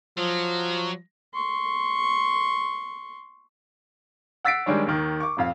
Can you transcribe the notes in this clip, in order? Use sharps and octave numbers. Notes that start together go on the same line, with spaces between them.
F3 F#3
C6 C#6
F#5 E6 A6 B6 C7 D7
D#3 G3 G#3 D4 C#5
D#2 D#3
C#6 D6
D#1 F2 F5